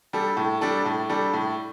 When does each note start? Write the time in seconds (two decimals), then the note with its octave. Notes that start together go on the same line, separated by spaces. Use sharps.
0.13 G3 D4 A4
0.37 A2
0.61 G3 D4 A4
0.85 A2
1.09 G3 D4 A4
1.33 A2